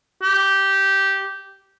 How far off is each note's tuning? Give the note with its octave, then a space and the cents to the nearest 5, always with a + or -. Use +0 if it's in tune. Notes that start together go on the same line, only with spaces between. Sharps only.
G4 -10